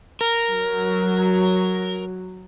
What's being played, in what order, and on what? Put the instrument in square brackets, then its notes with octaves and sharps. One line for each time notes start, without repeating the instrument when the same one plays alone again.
[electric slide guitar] A#4
[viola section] F#3